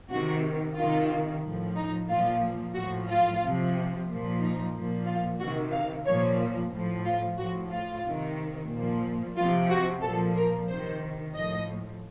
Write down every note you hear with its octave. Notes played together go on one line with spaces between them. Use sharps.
C3 D#3 F#4
C3 D#3 F4
A2 F3
D#4
A#2 F3 F4
A2 F3 F#4
F4
C3 F3
A#2 F3
D#4
A#2 F3
F4
C3 D#3 F#4
F5
A#2 F3 C#5
A2 F3
F4
A2 F3 F#4
F4
C3 D#3
A#2 F3
C3 F3 F4
F#4
A#2 F3 A4
A#4
C3 D#3 C5
A2 F3 D#5